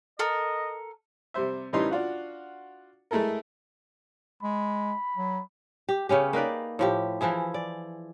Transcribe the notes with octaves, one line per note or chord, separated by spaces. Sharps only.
A4 A#4 D#5
C3 G3 C5 E5
A2 E3 G3 C#4 D#4 C6
D4 F4 F#4
G#3 A3 E4 A4 A#4
G#3 B5
F#3
G4
C#3 B3 C#4 G4
A#3 D#4 B4 D5
A2 F3 G4
E3 F3 E4 G#4
D5